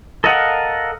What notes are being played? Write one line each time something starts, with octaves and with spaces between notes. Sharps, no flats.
A4 A#4 D#5 F5 F#5